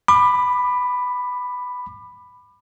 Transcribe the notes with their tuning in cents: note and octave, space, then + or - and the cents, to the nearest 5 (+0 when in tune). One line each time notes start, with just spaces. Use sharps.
B5 +5 D6 +30